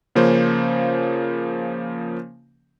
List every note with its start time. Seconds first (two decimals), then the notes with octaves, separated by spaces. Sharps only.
0.15 C#3 F3 A#3 C#4 C5